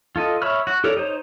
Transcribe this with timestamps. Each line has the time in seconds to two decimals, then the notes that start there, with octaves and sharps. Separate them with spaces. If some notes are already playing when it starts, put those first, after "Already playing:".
0.16 F4 A4 D#5
0.42 C#5 E5 B5 C#6 F6
0.67 F#4
0.84 G4 A4 A#4 C#5 D5
0.97 D#4 C5 C#5